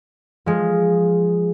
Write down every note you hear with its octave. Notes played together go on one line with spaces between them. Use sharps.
F3 G#3